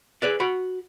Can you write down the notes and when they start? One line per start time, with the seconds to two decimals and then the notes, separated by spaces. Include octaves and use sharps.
0.22 G#4 B4 D5
0.40 F#4 B5